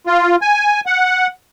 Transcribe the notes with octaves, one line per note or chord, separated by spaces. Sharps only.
F4
G#5
F#5